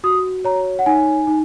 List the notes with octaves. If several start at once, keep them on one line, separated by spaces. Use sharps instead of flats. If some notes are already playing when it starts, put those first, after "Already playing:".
F#4 D#6
C#5 A#5
F#5
D#4 G#5
D#4